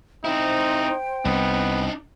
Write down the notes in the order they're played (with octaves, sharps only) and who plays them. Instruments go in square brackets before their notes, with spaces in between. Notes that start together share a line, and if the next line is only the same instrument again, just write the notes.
[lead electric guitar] C4 E4 [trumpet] D#4 [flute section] C5 G5
[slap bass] C2 [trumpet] B3 [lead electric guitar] D4 D#4